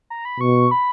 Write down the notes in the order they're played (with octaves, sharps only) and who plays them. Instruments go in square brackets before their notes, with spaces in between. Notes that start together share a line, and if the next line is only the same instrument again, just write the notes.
[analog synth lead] A#5
B5
[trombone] B2 [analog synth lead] C#6
[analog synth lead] B5